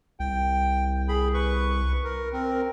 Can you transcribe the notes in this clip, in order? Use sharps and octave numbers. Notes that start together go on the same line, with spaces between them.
C2 G5
G#4 B5
B4 C#6
A#4
C4 A#4